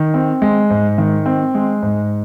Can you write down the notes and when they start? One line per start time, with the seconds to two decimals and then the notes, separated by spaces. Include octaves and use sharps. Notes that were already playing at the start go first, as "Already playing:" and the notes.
Already playing: D#3
0.14 C4
0.42 G#3
0.70 G#2
0.98 D#3
1.26 C4
1.55 G#3
1.83 G#2